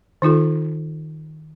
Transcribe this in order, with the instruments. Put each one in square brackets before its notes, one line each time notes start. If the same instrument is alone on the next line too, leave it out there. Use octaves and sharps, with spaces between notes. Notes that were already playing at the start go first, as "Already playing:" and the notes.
[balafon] D#3 D#4 F4 A4